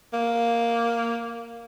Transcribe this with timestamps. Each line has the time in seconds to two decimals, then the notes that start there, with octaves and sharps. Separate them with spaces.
0.13 A#3